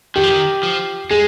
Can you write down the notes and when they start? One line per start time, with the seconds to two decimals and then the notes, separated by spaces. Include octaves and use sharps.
0.16 D#3 G4
0.23 F3
0.31 D#3
0.63 F3
1.10 G#3 G#4